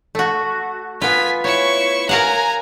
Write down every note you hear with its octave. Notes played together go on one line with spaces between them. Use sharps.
A3 F#4
B3 F4 G#5 B6
E4 C#5 C#6
A#4 F5 F#5 G#5 A#5